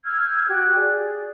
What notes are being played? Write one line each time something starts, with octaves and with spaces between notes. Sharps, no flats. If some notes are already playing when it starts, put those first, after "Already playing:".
E6 F6 G6 G#6
F#4 G4 G5 F#6
G#4 D5